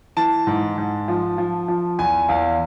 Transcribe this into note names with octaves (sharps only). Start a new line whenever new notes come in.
E3 A5
G#2
G#2
F3
F3
F3
E2 G#5
E2 F5